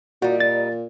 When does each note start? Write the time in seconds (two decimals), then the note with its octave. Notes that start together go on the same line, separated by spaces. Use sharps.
0.22 A#2 G3 D#4 F#4
0.40 A6